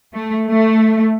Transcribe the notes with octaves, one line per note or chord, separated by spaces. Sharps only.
A3
A3